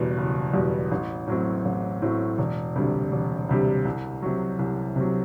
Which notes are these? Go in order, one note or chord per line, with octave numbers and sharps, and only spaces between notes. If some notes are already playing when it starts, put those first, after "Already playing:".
Already playing: F#1 E2 B2 G3
F#1
E2 B2 G3
A1
A2 F#3 C4
A1
A2 F#3 C4
E1
D2 C3 G3
E1
D2 C3 G3
C2
C3 F#3
C2
C3 F#3